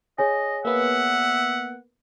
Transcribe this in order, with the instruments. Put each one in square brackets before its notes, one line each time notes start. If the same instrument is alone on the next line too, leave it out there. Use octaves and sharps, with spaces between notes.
[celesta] G#4 C#5 G#5 [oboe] D#5
[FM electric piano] A#3 B3 [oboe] E5 [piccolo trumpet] F#5